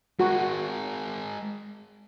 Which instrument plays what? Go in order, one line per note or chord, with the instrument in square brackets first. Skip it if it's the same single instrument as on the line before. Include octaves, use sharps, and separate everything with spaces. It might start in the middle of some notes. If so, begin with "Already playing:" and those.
[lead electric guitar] G#3 A#4 [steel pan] F#4